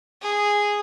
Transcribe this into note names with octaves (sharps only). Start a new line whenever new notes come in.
G#4